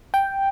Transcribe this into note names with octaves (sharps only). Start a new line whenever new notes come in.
G5